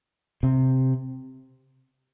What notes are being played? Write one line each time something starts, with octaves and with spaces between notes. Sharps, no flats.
C3